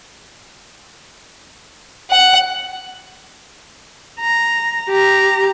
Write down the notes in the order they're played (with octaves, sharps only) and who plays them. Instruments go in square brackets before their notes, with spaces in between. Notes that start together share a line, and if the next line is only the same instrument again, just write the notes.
[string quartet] F#5
[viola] A#5
G4 A#5